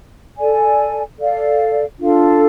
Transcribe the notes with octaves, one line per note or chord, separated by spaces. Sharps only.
A4 D5 G#5
A4 D5 F5
D4 F4 A4 F5